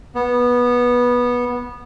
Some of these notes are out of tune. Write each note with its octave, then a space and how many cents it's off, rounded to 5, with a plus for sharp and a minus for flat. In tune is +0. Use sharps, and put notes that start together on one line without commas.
B3 -15